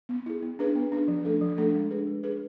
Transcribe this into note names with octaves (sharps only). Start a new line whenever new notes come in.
B3
E4 G#4
B3
D4 G#4 B4
B3
D4 G#4 B4
F3
A3 D4 A4
F3
A3 D4 A4
G#3
D4 G#4 B4
G#3
D4 G#4 B4